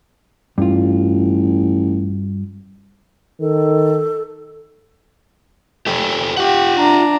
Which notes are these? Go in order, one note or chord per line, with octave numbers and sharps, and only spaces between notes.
A1 G2 F4
D#3 A4
G4 A4 C5
F4 G4 F#5
D4 A#5